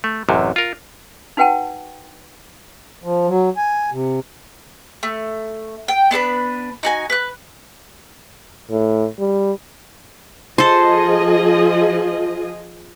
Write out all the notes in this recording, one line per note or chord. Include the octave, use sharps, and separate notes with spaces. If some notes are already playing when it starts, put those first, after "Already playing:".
A3
A1 F#2 C3
F4 A#4
D#4 F#4 B4 F#5 G5 A5
F3
F#3
G#5
C3
A3
G5
B3 D4 A4 B4
D#4 F#4 G#5
B4 F#6
A2
G3
F3 G#4 A4 C5 D#5